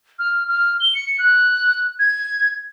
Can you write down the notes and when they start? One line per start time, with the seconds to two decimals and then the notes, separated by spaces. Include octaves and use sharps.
0.19 F6
0.48 F6
0.80 G7
0.95 C#7
1.19 F#6
1.99 G#6